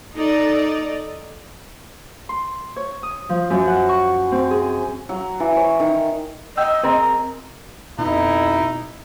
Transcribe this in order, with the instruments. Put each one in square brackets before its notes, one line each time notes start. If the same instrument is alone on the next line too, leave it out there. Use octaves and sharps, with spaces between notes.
[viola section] D#4 A4 D5
[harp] C6
C#5
D#6
F3
F#2
F#5
C#6
C4
G#4
[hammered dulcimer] F#3
E3
C#5
D#3
[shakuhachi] D#5 [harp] G5 E6
[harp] C4 G#4 [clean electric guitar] A#4
[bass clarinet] F2 [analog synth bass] B2 [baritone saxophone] D#4 [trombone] E4